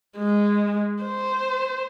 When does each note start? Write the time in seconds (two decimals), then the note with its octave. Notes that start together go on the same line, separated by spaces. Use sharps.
0.18 G#3
1.03 C5